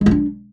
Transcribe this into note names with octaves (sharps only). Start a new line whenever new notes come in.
G#3
F4
D4